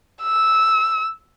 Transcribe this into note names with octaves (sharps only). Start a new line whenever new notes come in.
E6